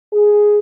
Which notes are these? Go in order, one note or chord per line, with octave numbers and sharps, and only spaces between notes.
G#4